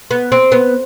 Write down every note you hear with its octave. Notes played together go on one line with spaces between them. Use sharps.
B3
C4
B3